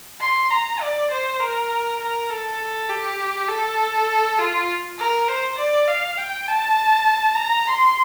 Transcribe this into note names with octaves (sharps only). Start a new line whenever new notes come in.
C6
A#5
D5
C5
A#4
A#4
A4
G4
A4
F4
A#4
C5
D5
F5
G5
A5
A#5
C6